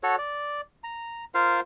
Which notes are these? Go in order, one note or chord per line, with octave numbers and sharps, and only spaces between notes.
F#4 A4 C#5
D5
A#5
F4 A#4 C5 F5